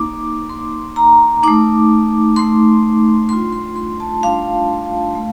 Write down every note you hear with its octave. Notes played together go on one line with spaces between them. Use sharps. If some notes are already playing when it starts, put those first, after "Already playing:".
Already playing: A#3 D#4 D6
A#3 D#4 C6
A#5
A3 D#4 D6
A3 D#4 C6
G3 D4 F4 C6
C6
C6
A5
G3 D4 F4 F5
A3